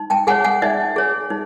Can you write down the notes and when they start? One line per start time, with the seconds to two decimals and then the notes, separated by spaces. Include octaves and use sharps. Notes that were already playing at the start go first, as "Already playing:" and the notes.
Already playing: D#4
0.10 G5 A5
0.27 G#4 C#5 F#5 G#5
0.44 F#5 G#5
0.62 D#4 D5 E5
0.96 G#4 C#5
1.30 D#4